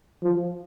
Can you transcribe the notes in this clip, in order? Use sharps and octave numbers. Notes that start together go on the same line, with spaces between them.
F3